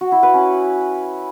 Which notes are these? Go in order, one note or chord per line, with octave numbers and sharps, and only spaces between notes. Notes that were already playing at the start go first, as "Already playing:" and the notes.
F#4
E4
B4
C#4